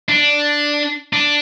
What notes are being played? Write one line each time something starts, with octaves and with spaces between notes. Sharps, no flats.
D4
D4